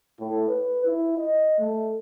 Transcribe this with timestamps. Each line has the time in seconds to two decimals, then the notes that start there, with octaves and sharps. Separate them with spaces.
0.20 A2
0.48 B4
0.85 E4
1.18 D#5
1.59 A3